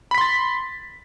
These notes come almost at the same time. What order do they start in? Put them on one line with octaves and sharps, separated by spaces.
B5 B6 C6 A6